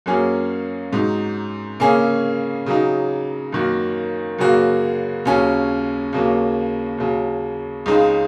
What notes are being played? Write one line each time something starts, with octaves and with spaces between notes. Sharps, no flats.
F#2 F#3 A#3 C#4 G#4
G#2 F#3 D#4
C#3 A#3 C#4 G#4
C#3 F#3 D#4
F#2 D#3 A#3 F#4
F#2 C#3 F#3 A#3 F#4
D#2 C#3 F#3 C#4
D#2 C#3 F#3 A#3
D#2 C#3 F#3
C#2 C#3 G#3 D#4